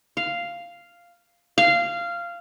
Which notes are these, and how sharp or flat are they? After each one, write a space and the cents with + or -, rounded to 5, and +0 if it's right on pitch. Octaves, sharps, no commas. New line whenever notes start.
F5 -5
F5 -15